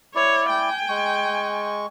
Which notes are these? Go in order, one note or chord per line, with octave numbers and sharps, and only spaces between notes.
E4 C#5 D5
G5 G#5
G#3 C#6